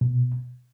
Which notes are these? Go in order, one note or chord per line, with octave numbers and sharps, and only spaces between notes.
B2